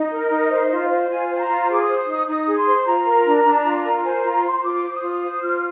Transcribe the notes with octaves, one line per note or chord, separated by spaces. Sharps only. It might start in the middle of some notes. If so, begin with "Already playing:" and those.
Already playing: D#4 D#5
A#4
D#4
C5
F4
C5
F4 G#5
C5
G#5
A#5
F4
G#4 D6
D#6
C5
D#6
D#4
D#6
D#4 D#6
G#4
C6
C5
F4 A#5
A#4
D4
D4
F4
A#4
C5 G#5
F4 A#5
C5 C6
F4 D6
C5
D#6
F4
C5 D#6
F4 F6